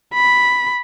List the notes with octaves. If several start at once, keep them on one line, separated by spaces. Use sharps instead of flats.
B5